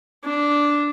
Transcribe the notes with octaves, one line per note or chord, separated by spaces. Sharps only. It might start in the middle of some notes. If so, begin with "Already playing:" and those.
D4